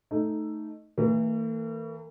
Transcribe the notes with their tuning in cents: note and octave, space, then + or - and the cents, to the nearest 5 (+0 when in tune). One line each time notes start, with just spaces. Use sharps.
A3 +0 D#4 +0
E3 -35 A3 +45